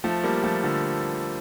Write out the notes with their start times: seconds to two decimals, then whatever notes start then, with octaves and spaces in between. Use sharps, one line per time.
0.04 F3 A3
0.23 G3 A#3
0.44 F3 A3
0.64 D3 F3